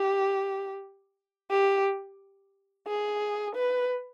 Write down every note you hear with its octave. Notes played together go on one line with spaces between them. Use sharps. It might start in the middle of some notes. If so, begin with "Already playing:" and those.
Already playing: G4
G4
G#4
B4